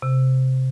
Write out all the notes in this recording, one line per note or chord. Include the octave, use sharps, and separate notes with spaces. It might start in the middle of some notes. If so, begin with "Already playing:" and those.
C3